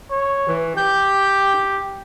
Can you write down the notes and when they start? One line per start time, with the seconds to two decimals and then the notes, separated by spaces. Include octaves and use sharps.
0.11 C#5
0.48 E3
0.77 G4 G6